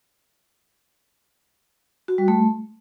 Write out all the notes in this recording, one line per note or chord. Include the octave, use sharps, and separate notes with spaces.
F#4
G3
A3